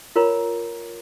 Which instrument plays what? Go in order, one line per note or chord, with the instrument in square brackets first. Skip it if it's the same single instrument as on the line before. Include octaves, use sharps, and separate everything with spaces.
[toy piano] F4 A#4 C#5 A#5 B5